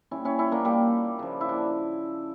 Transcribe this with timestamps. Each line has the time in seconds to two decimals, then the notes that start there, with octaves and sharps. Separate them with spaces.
0.11 A#2 G3 C#4 E4
0.25 C#4 E4
0.39 C#4 E4
0.52 A#3 D4
0.65 G3 A#3
1.19 C#3 F3
1.41 E4
1.49 D4